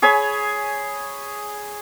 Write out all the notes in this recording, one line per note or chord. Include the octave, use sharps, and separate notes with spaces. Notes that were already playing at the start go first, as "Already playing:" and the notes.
G#4 C#5 G#5 B5